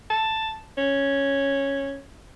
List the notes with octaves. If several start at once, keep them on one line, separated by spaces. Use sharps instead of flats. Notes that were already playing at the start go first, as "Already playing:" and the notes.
A5
C#4